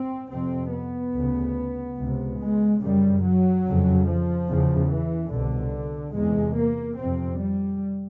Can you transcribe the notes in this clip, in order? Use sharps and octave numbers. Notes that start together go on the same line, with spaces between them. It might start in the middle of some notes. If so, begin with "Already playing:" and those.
Already playing: C4
F2 C3 C4
B3
D2 C#3
C#2 C3
G#3
F#2 C#3 G3
F#3
F2 C#3
F3
E2 C#3
E3
C2 B2 D3
E2 C3 G#3
A#3
F2 C3 C4
G3